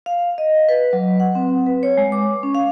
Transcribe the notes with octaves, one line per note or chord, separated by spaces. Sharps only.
F5
D#5
B4
F#3
F#5
C4
B4
C#5
G#3
D6
C#4
F5